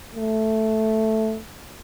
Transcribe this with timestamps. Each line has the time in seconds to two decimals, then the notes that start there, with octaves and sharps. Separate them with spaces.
0.15 A3